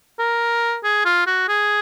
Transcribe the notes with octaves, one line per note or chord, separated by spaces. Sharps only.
A#4
G#4
F4
F#4
G#4